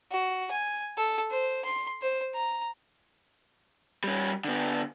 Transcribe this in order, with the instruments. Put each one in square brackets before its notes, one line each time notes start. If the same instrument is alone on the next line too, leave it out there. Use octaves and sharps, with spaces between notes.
[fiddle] F#4
G#5
A4
C5
C6
C5
A#5
[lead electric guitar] G3 C#4
D3 B3